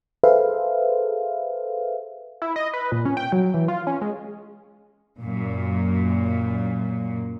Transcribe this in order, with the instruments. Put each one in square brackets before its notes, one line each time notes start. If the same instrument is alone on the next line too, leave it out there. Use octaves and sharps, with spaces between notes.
[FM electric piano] G#4 A4 B4 C5 E5 F5
[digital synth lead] E4
D#5
B4
A#2
C#4
G5
F#3
E3
F4
C#4
G#3
[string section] F#2 A#2